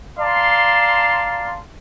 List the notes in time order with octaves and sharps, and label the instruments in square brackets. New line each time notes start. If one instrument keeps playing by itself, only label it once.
[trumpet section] D5 F5 A5 A#5 C6